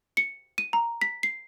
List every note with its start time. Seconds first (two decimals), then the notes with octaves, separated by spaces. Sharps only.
0.17 C#7
0.58 D#7
0.73 A#5
1.02 B6
1.23 C7